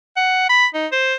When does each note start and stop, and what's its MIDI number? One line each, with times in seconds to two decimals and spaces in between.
0.16 0.47 78
0.49 0.66 83
0.74 0.87 63
0.92 1.15 72